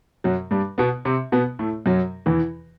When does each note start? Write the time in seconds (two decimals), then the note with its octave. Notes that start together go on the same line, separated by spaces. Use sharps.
0.24 F#2 F#3
0.51 G2 G3
0.78 B2 B3
1.05 C3 C4
1.32 B2 B3
1.59 A2 A3
1.86 F#2 F#3
2.26 E2 E3